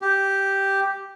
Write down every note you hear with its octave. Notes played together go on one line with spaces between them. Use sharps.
G4